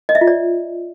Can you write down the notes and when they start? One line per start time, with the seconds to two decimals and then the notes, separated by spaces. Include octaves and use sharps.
0.09 D#5
0.15 E5
0.21 F4
0.27 D5